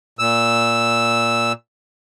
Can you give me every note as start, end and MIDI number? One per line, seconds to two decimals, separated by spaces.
0.19 1.53 46
0.19 1.53 88